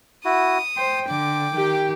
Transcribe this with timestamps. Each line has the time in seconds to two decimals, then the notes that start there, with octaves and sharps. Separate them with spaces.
0.25 E4 F#4 D#6
0.77 C5 G5
1.09 D3 D6
1.54 D#3 G4